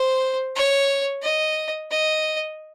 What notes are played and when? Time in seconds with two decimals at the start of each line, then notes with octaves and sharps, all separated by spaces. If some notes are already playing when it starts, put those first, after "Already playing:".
Already playing: C5
0.56 C#5
1.22 D#5
1.91 D#5